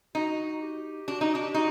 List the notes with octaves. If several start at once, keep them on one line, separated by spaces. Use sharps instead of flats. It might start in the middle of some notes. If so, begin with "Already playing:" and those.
D#4 F#4
G4
D4 F#4
D#4
D4
G4
D#4 F#4